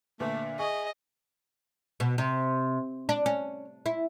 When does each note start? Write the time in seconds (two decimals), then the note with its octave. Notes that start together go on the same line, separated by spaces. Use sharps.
0.20 A#2 D3 A3 B3 E5
0.59 G#4 D#5 C#6
2.00 B2
2.18 C3
3.09 D4
3.26 C#4
3.86 E4